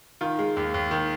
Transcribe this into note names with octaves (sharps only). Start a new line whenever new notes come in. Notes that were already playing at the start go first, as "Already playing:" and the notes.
D#3 F4
G#3
D#2
D#2
D#3